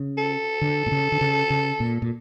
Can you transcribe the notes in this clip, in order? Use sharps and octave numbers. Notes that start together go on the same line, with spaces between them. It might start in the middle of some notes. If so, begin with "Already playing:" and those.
Already playing: C#3
A4
D3
A#2
C#3
D3
C#3
C#3
A#2
A#2